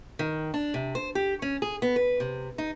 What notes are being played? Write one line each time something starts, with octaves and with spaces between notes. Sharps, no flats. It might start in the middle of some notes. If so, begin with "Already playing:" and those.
D#3
D4
C3
C5
G4
C#4
G#4
B3
B4
C3
D#4